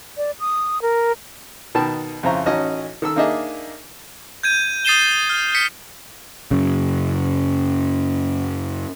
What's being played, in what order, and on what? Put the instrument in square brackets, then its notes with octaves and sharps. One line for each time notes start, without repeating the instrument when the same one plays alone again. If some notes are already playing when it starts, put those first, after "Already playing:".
[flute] D5
D#6
A#4
[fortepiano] B2 D#3 G5 A5
F2 C#3 E4 C5 A#5 C#6
A1 C#4 D#4 F#4 D#5
D#3 A4 E6
A#3 D4 D#4 G#4 D#5 E5
[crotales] G6 G#6 D#7
D#6 A6 C7 D#7 E7 G7
F6
B6 C#7
[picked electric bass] F#2 C#3